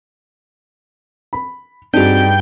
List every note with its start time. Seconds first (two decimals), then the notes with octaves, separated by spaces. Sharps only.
1.33 B5
1.94 G2 C4 D4 D#4 F#4 G#4 G5